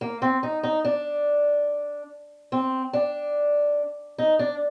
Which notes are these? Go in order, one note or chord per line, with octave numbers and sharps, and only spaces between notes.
A#3
C4
D#4
D#4
D4
C4
D4
D#4
D4